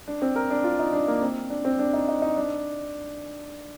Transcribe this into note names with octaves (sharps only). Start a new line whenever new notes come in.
D4
C4
A#4
D4
F4
D#4
D4
A#3
C4
D4
C4
D4
D#4
D#4
D#4
D4